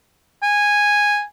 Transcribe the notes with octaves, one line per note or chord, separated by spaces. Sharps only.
G#5